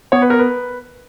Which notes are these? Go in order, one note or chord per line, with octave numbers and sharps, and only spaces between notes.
B3 C#5
B4
A#4
B4